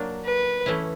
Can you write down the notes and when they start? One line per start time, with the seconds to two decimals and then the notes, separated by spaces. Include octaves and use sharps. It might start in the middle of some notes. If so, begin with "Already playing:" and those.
Already playing: F#3 A#3 D4
0.24 B4
0.66 E3 A3 C#4 E4